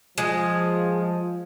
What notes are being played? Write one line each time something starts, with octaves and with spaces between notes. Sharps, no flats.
F3 G#3